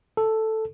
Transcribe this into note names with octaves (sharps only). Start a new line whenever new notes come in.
A4